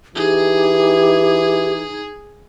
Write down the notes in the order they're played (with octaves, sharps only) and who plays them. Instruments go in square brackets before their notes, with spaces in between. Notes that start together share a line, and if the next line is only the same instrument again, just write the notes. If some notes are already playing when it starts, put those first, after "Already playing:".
[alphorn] E3 [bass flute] D#4 [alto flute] G4 [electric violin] G#4